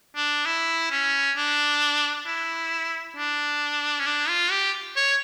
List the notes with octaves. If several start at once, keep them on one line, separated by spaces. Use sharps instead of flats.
D4
E4
C#4
D4
E4
D4
C#4
D4
F4
G4
C#5